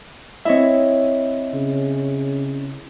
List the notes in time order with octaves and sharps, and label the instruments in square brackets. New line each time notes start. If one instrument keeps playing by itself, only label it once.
[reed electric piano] C4 D#5 E5 [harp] E4 C#5
[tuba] C#3